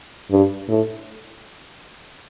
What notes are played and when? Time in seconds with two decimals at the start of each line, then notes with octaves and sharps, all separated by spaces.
0.32 G2
0.69 A2